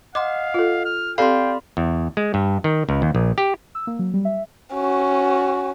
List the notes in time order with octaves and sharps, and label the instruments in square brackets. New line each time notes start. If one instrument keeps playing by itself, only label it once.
[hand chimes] D#5 F#5 [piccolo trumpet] F5 [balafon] C6 D6
[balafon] F4 A4
[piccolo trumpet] F6
[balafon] C4 G4 A4 [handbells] D5 F5 [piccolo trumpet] G5 [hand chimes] B5 C6
[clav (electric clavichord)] E2
G#3
G2
D#3
C#2
D#2
A#1
G4
[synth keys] E6
A#3
F#3
G3
E5
[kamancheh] C#4 F#4